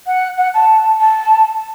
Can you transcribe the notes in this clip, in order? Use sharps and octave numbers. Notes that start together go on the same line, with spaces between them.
F#5
F#5
A5
A5